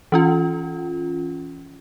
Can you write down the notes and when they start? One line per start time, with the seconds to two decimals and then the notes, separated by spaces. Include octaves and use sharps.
0.12 E3 C#4 F4